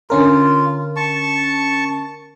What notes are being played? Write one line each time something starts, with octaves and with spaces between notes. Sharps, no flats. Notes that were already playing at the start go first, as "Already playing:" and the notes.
D3 C#4 F4 A#4
A5 C#6